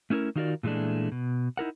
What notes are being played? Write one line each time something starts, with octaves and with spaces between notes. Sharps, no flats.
A3 C#4 E4 G#4 A#4
D#3 D#4 F4 F#4 A#4 D5
A#2 E3 G#3 A3 D4
B2
D#4 E4 A#4 F#5